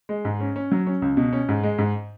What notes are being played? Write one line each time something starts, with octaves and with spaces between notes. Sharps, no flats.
G#3
G#2
C#4
C#4
F#3
C#4
C#2
B2
C#4
G#2
G#3
G#2